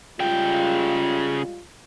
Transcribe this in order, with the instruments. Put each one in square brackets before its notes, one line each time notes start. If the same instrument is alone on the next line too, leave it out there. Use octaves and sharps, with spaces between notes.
[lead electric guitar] C#3 G5 [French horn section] G3 G#3 F4